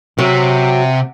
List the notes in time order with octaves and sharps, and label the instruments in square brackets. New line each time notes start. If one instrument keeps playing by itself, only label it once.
[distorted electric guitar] C3 [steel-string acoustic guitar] F#3